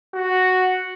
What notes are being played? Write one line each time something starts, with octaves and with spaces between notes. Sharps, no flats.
F#4